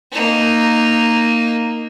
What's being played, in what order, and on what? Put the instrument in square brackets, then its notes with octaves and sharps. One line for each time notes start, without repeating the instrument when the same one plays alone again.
[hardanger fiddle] A#3 D#4